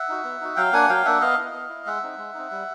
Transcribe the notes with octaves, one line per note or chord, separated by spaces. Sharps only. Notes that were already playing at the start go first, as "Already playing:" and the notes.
Already playing: E5 F#5
D#4 F#4
B3
D#4 F#4
F#3 F5 G5
A#3 D4 F#5 G#5
F#3 F5 G5
A#3 D4 E5 F#5
B3 D#5 F5
E4
B3
E4
G#3 E5 F#5
C4 D#4
G#3
C4 D#4
G3